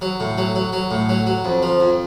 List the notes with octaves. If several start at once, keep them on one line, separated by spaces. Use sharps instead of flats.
F#3
A2
F#3
F#3
F#3
A2
F#3
F#3
F2
F3
F2